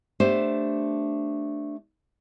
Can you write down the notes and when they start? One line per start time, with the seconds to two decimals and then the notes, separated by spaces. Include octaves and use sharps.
0.20 A3 B3 D4 G4 C5